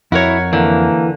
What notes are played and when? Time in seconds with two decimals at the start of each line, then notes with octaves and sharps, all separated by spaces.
0.12 F2 E4 F#4 A#4 C#5
0.53 D3 E3 A#3